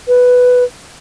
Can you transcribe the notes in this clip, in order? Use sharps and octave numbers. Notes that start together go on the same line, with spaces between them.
B4